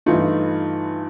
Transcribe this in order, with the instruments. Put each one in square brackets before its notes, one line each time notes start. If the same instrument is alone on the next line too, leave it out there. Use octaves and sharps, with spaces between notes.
[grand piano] G2 E3 A3 [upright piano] D#4 F4